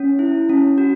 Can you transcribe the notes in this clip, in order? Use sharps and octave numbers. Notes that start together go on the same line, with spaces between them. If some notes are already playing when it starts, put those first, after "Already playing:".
Already playing: C#4
E4
C#4
F#4